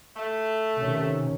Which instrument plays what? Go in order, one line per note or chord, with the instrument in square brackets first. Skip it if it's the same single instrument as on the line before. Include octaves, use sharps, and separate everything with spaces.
[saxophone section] A3
[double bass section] C3 D#3 C#4